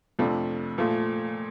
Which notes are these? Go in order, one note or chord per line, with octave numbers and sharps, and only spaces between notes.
F2 C3 F3 A3 D4
A#2 F3 A3